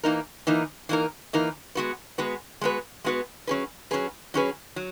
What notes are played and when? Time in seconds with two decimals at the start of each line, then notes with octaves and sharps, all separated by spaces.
0.03 E3 A#3 D#4 A#4
0.47 E3 A#3 D#4 A#4
0.89 E3 A#3 D#4 A#4
1.33 E3 A#3 D#4 A#4
1.75 G#3 B3 F#4 B4
2.18 G#3 B3 F#4 B4
2.61 G#3 B3 F#4 B4
3.04 G#3 B3 F#4 B4
3.47 F#3 C#4 G#4 B4
3.91 F#3 C#4 G#4 B4
4.34 F#3 C#4 G#4 B4
4.76 F#3